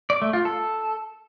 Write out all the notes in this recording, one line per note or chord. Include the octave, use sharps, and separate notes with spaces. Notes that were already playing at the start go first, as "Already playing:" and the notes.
D5
A3
F4
A4